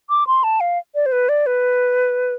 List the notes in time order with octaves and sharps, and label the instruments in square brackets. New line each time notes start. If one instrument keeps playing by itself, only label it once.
[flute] D6
C6
A5
F5
D5
C5
B4
D5
B4